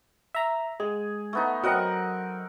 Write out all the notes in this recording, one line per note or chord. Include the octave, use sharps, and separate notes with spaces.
E5 A#5
G#3 G#4
A3 B3 D#4
F#3 C4 A#4 D#5 F#5